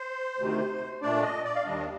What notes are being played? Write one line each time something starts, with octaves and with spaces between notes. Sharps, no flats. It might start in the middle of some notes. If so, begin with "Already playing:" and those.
Already playing: C5
D2 C3 D#3
A#2 A3 D4 D5
D#5
D5
F5
D#2 D#3 G3 D4 D#5